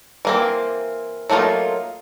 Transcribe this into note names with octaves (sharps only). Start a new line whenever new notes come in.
E3 A#3 C4
F#3 A3 A#3 D#4 F4